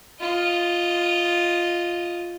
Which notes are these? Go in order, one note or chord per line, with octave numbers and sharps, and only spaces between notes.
F4 D#5